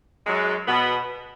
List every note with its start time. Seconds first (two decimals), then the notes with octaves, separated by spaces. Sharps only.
0.25 F#2 F#3 G#3
0.67 B2 B3